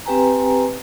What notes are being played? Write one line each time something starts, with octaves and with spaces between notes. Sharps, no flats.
C4 G4 B4 G5 G#5 A#5